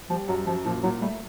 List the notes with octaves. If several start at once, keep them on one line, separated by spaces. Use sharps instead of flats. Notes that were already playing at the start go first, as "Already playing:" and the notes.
F3 G3
F#2 F#3
F#2 F3
A#2 F3
A#2 F#3
G3 A3